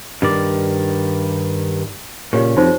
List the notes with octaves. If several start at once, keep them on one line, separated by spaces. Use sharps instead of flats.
G2 D#3 D5
A#2 C#3 G4 C#5 D#5
F2 D#4 F#4 C5